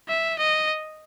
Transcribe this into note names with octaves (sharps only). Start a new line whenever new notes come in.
E5
D#5